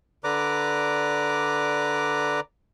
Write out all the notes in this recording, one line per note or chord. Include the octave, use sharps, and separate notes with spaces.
D3 B4 D5 A#5 D6